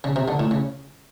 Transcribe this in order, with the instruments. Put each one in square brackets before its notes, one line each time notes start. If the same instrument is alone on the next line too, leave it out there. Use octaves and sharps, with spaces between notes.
[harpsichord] C#3
C3
D3
A2
C#3